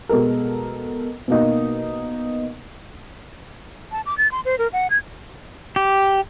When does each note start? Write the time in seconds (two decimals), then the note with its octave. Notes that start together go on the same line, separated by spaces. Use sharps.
0.09 B2 G#3 A4 A#4
1.28 B2 A#3 D#4
3.92 A5
4.06 D6
4.18 A6
4.32 C6
4.45 C5
4.59 A#4
4.73 F#5
4.90 G#6
5.76 G4